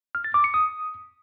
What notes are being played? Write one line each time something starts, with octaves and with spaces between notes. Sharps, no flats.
F6
A6
D6
C#7
D#6